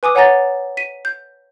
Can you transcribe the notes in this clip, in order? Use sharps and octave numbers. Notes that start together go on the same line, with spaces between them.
B4 G#5 D6 D#6
C#5 F#5 G#5 A#5 A6 A#6
B6 D#7
G6